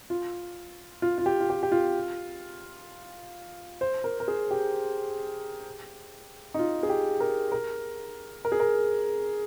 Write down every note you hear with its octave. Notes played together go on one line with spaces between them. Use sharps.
F4
F4
F4
G4
F4
G4
G4
F4
C5
A#4
A#4
G#4
G4
D#4
F4
G#4
G4
A#4
A#4
A#4
G#4
A#4